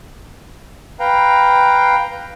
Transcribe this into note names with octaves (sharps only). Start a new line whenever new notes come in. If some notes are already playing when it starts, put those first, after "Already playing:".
B4 F5 G5 A#5